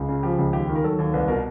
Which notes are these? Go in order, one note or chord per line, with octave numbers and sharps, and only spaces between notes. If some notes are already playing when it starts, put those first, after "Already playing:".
Already playing: C#2
C#3
F3 G4
C#2
D#2 G4
D#3
A#4
F#3 A4
D#2
C2 B4
B2 A#4